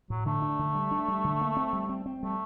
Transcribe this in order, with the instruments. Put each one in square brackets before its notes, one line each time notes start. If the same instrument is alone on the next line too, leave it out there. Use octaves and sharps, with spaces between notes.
[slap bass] A2 [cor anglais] F#3
[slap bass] D3 [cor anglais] A3
[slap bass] D4
D3
G3
D4
G3
D3
A#3
C4
G3
C4
C4
[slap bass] G3 [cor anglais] A3